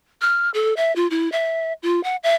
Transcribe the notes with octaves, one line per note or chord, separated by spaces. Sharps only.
F6
A4
E5
F4
E4
E5
F4
F#5
E5